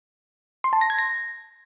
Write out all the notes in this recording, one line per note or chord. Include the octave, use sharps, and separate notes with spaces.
C6
A5
A#6
G#6
A#6